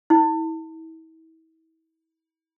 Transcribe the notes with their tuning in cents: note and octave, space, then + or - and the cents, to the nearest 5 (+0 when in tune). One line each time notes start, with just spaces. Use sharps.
E4 -35